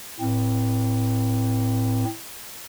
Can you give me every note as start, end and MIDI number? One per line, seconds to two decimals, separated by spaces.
0.20 2.04 45
0.20 2.04 60